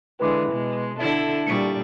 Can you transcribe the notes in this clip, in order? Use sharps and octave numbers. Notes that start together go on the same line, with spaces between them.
D3 E3 G#3 B4 B5 D6
B2 G#3
D3 E4 A4 E5
A#2 G3 C#6 B6 C#7